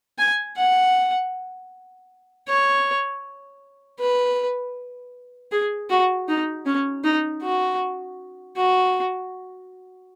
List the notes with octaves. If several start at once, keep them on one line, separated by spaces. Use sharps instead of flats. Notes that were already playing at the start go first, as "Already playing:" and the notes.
G#5
F#5
C#5
B4
G#4
F#4
D#4
C#4
D#4
F#4
F#4